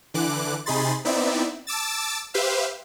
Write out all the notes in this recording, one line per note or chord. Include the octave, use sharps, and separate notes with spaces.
D3 E3 D6 F#6
C3 D#4 G#4 B5 C6 A6
B3 C4 D#4 E4 D5 E5
A5 D6 E6 A6
G4 B4 C5 E5 F5